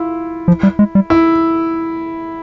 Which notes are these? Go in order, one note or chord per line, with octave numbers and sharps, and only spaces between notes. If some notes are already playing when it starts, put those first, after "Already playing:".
Already playing: E4 F4
F3
G3
G#3
G3
E4